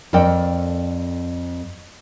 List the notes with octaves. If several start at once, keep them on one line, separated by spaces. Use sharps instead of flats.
F2 A4 A#4 D5 G5